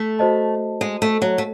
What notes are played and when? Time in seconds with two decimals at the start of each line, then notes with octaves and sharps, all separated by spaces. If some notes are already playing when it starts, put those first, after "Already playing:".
Already playing: A3
0.19 F#4 C5 D#5 A5
0.81 G#3
1.02 A3
1.22 F#3
1.38 A3